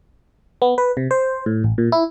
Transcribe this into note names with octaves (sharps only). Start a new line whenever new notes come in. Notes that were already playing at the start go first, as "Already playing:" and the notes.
B3
B4
C3
C5
A2
A1
A#2
E4